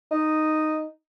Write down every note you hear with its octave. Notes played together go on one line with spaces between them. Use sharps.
D#4